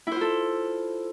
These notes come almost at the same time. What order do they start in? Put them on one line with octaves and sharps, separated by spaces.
E4 C5 F4 A4